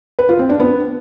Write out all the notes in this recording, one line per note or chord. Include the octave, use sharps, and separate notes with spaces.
B4
F4
C4
D4
B3